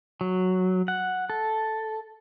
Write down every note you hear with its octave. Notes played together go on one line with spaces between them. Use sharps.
F#3
F#5
A4